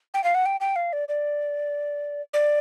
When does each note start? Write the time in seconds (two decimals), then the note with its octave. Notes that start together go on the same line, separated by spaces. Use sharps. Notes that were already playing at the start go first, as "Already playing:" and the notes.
0.14 G5
0.24 F5
0.35 F#5
0.46 G5
0.61 G5
0.76 F5
0.93 D5
1.09 D5
2.34 D5